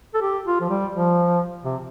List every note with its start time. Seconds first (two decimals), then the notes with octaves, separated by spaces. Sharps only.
0.14 A4
0.22 G4
0.46 F4
0.61 F3
0.70 G3
0.93 F3
1.64 C3